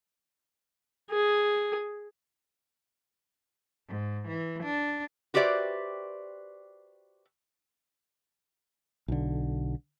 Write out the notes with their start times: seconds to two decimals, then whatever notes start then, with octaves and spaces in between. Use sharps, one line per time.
1.10 G#4
3.88 G#2
4.28 E3
4.63 D4
5.34 F#4 G4 B4 C5 D5 E5
9.08 B1 D3